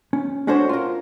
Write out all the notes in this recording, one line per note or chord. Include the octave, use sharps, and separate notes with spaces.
C#4
C#4 D4 F#4 A4 C5 C#5
F4 A#4